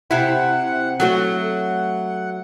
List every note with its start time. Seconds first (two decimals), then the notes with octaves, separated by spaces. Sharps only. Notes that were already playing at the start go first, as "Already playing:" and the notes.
0.11 C3 E4 F#5
1.00 F#3 A3 F#4 F#5